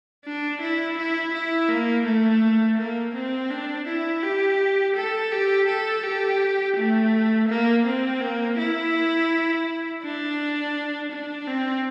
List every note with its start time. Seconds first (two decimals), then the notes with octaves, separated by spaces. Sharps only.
0.25 D4
0.61 E4
0.98 E4
1.34 E4
1.69 A#3
2.06 A3
2.78 A#3
3.14 C4
3.50 D4
3.87 E4
4.23 G4
4.96 A4
5.32 G4
5.69 A4
6.04 G4
6.77 A3
7.49 A#3
7.86 C4
8.21 A#3
8.58 E4
10.03 D4
11.11 D4
11.47 C4